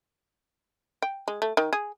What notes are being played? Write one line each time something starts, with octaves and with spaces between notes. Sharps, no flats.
G5
G#3
A3
D#3
G#4